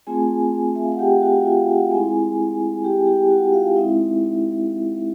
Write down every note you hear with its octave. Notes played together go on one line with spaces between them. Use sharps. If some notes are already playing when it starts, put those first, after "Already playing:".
A3 C4 F4 G#4 G#5
E5
F5
F#5
G4 G5
F#4 F#5
F4 F5
F#4 F#5
G#3 C4 E4 G#4 G#5
G4 G5
G4 G5
F#4 F#5
F4 F5
G#3 C4 D#4 E4 E5